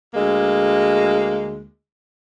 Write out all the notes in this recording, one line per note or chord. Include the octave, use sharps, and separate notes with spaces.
D2 G#3 A#3